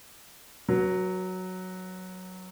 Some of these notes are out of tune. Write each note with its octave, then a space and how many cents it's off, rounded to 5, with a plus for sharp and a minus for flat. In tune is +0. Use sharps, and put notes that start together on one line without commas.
F#3 +0 B4 -45